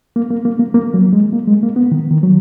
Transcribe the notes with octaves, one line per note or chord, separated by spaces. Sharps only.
A#3
A#3
A#3
A#3
A#3
F#3
G#3
A#3
G#3
A#3
B3
D#3
D#3
F#3